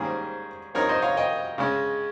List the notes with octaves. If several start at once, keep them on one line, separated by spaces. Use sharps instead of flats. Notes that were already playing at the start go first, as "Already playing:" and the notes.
Already playing: G#2 D#3 G3 A#3 C#4 G#4 C5
G2 F3 C4 D#4 A#4 C#5
C5 D#5
C#5 F5
D#5 G5
C#3 G#3 C#4